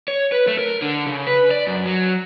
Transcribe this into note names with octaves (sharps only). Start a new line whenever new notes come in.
C#5
B4
A3
A#4
D3
C#3
B4
D5
F#2
F#3